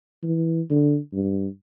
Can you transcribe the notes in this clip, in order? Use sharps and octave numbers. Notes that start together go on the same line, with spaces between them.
E3
D3
G2